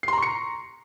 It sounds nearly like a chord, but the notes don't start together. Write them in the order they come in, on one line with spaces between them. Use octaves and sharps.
C7 C6 A#5 C#6 C#7